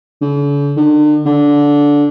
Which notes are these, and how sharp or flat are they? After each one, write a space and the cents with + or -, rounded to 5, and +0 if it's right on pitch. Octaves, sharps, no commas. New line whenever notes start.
D3 -45
D3 +40
D3 -15